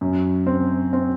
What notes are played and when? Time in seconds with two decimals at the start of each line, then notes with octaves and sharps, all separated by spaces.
0.01 F#2
0.47 C4
0.93 C4